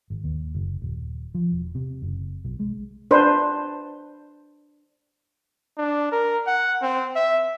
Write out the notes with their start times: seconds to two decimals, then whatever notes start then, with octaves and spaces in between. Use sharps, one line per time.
0.10 G#1
0.24 D#2
0.55 F#1
0.82 D#1
1.35 F3
1.52 E1
1.75 C3
2.02 F#1
2.45 B1
2.59 G#3
3.11 D4 B4 C5
5.77 D4
6.12 A#4
6.47 F#5
6.82 C4
7.16 E5